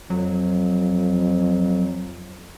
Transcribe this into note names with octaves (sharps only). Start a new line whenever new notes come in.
F2 F#3